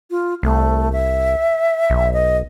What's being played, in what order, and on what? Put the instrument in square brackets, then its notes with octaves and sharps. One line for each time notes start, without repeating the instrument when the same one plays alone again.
[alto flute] F4
[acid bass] C2 [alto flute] A3
[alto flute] E5
[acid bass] B1
[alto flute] D#5